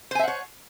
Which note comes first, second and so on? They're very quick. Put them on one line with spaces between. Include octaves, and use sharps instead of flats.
C5 G#5 E5 F#5 C#5